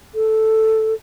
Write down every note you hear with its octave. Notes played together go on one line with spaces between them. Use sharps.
A4